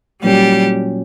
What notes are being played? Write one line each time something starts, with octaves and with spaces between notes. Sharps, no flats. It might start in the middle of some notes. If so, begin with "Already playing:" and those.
A#2 F#3 G3 C#4 F#4 G4